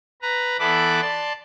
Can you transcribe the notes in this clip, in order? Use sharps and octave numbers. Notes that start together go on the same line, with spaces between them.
B4 A#5
E3 B3 A4 B4 D5 D6
D5 A5 C6